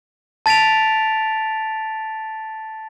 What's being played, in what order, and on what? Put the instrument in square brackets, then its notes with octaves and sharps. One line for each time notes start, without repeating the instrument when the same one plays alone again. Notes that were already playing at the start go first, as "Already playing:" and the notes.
[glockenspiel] A5 A6 B6 D7 F7